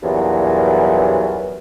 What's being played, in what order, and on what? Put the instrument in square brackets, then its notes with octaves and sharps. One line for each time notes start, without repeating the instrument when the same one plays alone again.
[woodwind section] E2 G2 A#2 E3 F#3